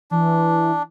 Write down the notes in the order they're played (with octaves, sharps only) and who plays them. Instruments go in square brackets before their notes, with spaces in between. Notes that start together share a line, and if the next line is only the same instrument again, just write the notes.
[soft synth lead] E3 [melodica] D4